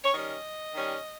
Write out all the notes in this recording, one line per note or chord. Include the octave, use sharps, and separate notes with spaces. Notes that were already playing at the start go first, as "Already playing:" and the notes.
C#5
D#3 G3 C#4 D#5
D#3 G3 C#4